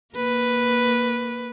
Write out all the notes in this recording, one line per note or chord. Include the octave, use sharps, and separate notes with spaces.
A#3 B4